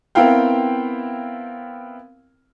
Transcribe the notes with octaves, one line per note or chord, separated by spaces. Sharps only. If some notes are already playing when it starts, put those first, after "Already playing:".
B3 C4 E4 A#4 F5 G5